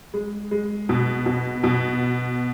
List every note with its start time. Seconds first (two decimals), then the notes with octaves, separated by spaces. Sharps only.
0.14 G#3
0.51 G#3
0.89 B2
1.26 B2
1.64 B2